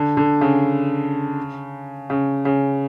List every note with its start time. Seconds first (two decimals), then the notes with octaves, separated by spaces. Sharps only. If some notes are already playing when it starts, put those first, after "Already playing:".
Already playing: D3
0.17 D3
0.41 C#3
2.10 C#3
2.45 C#3